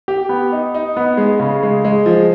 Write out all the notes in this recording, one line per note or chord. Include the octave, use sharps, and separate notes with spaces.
G4
B3
D#4
D#4
B3
G#3
C#3
G#3
G#3
F3